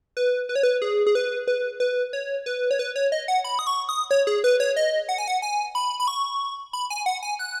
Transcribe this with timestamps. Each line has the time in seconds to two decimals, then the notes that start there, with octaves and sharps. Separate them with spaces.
0.17 B4
0.49 B4
0.56 C#5
0.63 B4
0.82 G#4
1.07 G#4
1.15 B4
1.48 B4
1.80 B4
2.13 C#5
2.46 B4
2.71 C#5
2.79 B4
2.96 C#5
3.12 D#5
3.28 F#5
3.44 B5
3.59 D#6
3.67 C#6
3.89 D#6
4.11 C#5
4.27 G#4
4.44 B4
4.60 C#5
4.76 D#5
5.09 F#5
5.18 G#5
5.28 F#5
5.42 G#5
5.75 B5
6.00 B5
6.08 C#6
6.73 B5
6.90 G#5
7.06 F#5
7.23 G#5
7.39 F#6